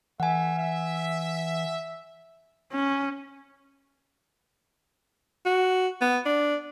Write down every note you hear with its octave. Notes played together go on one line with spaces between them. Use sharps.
E3 A3 E5 F#5 G#5
E5
C#4
F#4
B3
D4